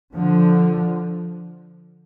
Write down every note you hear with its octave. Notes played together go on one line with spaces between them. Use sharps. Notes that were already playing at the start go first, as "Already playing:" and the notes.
D3 F3